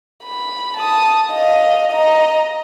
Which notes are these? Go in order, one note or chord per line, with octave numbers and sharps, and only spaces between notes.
B5
A5 D#6
D#5 F5
D#5 A#5